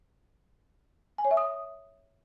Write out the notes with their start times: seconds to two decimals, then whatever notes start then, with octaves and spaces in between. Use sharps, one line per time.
1.18 G#5
1.25 C#5
1.31 E5
1.37 D#6